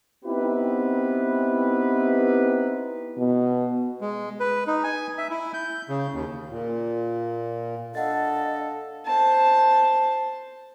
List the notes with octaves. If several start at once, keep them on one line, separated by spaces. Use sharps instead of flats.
B3 C4 D#4 E4 G4 B4
B2
G#3
B4
D#4
G#5
E5
E4
G6
C#3
D#2
A#2
D4 A4 D#5 F5 F#5 A6
C5 A5